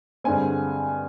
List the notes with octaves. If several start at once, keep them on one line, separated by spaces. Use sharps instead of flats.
G2 D3 G#3 C4 G#5